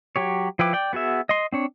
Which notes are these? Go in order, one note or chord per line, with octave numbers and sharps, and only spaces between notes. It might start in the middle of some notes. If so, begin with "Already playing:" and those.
F#3 G4 C#5
F3 E4 B4 G5 D6
D5 G5
B3 F#4 G#4 E5
D#5 C6
C4 D4 C#5